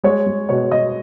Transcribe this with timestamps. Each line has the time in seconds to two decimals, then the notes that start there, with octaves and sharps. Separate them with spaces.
0.04 G#3 C#5
0.26 G#3
0.49 B2 C#5
0.71 B2 D#5